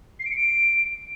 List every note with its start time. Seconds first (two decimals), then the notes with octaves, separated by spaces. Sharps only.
0.20 C7
0.25 D7
0.31 C#7
0.37 D7